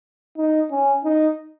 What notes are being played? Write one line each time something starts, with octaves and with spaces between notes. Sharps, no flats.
D#4
C#4
D#4